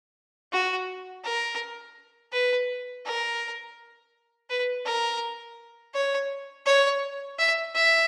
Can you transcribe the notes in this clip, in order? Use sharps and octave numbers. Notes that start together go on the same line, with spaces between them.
F#4
A#4
B4
A#4
B4
A#4
C#5
C#5
E5
E5